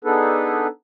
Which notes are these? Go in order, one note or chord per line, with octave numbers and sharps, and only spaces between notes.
B3 D4 D#4 G#4 A4 B4